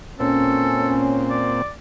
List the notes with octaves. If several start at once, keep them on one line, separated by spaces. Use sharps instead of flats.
A#2 C4 C#4 A4
D5